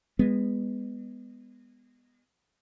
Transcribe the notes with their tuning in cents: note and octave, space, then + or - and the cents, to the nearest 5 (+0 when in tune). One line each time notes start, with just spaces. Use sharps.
G#3 -25 B3 +0